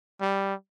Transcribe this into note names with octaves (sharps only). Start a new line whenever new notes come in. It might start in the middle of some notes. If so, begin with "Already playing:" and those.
G3